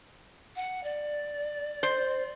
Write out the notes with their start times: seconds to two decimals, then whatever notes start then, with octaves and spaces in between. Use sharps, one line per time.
0.56 F#5
0.83 D5
1.83 C5